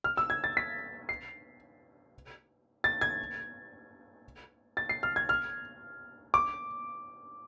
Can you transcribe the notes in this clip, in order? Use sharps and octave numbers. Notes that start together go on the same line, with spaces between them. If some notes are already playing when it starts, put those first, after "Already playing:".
F6
E6
G#6
A6
B6
C7
A6
G#6
A6
C7
F6
G#6
F6
D6